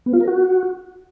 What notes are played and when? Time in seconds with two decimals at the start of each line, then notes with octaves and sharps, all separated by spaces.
0.06 B3
0.13 F4
0.20 A#4
0.28 F#4